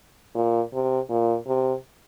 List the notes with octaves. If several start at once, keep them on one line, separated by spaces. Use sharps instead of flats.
A#2
C3
A#2
C3